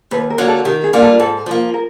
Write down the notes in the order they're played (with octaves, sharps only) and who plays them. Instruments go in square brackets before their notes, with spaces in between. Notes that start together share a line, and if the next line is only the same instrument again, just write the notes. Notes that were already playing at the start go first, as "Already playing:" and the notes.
[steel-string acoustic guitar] D#2 [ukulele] B4
[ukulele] A#4
[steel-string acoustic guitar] D3 F#3 A#3
[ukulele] A4
[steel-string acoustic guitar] D#3 [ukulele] G4
[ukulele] G#4
[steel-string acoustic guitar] G3 A#3 D4 F4
[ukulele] A4
[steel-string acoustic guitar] G#2 [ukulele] A4
[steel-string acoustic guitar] F3 A#3
[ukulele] A#4